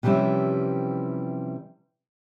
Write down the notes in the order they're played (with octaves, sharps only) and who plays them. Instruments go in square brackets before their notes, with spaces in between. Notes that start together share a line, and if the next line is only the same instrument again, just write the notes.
[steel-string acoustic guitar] C3 E3 F3 G3 C#4 E4